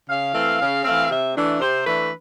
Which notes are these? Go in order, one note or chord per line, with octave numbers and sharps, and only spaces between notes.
C#3 F5
E3 A3 C4
C#3
E3 A3 C4
C3 E5
E3 A3 D4
C3 C5
E3 A3 D4 B4